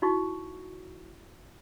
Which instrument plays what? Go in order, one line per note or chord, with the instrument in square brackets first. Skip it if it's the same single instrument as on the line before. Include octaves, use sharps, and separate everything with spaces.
[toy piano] D#4 E4 F#4 C#6